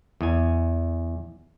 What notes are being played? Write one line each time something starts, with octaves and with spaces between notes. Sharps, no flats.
E2 D#5 G#5